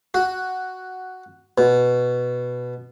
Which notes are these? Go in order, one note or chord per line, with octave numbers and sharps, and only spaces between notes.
F#4
B2